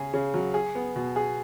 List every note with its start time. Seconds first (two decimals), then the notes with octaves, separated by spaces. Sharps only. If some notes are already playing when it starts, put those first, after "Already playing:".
Already playing: C#3 G#4
0.13 C#3
0.34 F#3
0.54 G#4
0.75 B3
0.96 B2
1.16 G#4